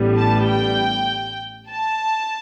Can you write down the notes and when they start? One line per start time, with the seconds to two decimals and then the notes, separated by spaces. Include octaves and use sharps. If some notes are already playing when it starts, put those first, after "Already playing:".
Already playing: A1 A2 G3 B3
0.17 A5
0.48 G5
1.71 A5